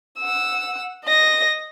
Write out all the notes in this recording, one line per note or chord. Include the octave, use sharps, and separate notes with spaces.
F#5 E6
D#5 A#6